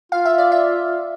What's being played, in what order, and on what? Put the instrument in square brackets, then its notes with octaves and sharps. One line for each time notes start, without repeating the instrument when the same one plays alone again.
[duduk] F4 [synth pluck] F5
[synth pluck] E5
D5
E5